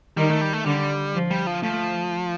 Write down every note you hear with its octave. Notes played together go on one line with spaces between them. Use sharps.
D#3 G3
A3
G3
A3
D3 G3
F3
G3
F3
F3 A3